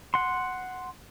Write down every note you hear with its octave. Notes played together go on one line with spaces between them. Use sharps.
F#5 C6